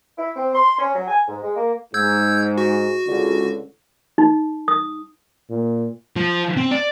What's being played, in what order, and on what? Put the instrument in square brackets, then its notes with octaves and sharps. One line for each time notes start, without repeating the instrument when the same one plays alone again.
[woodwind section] E4
C4
C6
C#4
F#3
G#5
G#2
G#3
A#3
[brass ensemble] G#2 [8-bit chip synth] E6 G6 G#6
[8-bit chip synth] F#4
[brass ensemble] C#2 D3
[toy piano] D#4
D#6
[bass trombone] A#2
[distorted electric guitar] F3
C4
D5